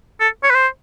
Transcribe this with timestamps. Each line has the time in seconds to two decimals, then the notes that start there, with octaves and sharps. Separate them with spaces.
0.20 A4
0.44 C#5
0.50 B4
0.55 C5